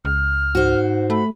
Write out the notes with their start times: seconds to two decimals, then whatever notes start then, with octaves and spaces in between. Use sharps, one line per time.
0.05 C#2 F6
0.55 G#2 F#4 C5
1.10 A3 B5